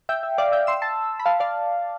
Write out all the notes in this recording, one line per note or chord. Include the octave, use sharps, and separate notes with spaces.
E5 G5
E5
D5 F5
E5 G5
C6 E6
A5 C6
B5
F5 A5
D5 F5